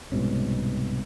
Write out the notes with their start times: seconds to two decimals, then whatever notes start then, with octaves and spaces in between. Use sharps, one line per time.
0.12 C2 G#2 B2 C#4